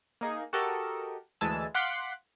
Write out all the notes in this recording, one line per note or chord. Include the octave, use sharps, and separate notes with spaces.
A#3 D#4 G#4
F#4 G4 A4 A#4 D#5
D2 E3 G#3 G#5 A5 E6
F5 F#5 C6 D6 F#6 B6